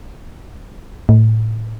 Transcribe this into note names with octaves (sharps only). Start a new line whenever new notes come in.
A2